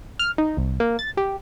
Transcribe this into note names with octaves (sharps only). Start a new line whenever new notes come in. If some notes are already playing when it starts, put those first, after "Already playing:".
F6
D#4
C2
A#3
A6
G4